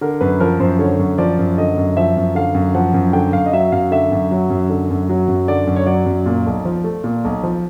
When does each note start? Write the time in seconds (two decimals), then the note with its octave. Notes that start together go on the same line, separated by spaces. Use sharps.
0.01 D3 A#4
0.21 F#2 B4
0.40 F3 A#4
0.59 F#2 C5
0.79 D3 C#5
0.99 F#2
1.18 F3 D5
1.39 F#2
1.58 D3 D#5
1.77 F#2
1.97 F3 E5
2.17 F#2
2.35 D3 F5
2.55 F#2
2.74 F3 F#5
2.94 F#2
3.13 D3 G5
3.33 F#2 F5
3.46 D#5
3.53 F#3 E5
3.72 F#2 F5
3.91 D3 E5
4.12 F#2
4.31 F#3
4.50 F#2
4.69 D3
4.90 F#2
5.09 F#3
5.28 F#2
5.48 D3 D5
5.67 F#2
5.76 C#5
5.87 F#3 D5
6.06 F#2
6.26 A#2
6.46 B1
6.65 F3
6.84 A3
7.04 A#2
7.24 B1
7.43 F3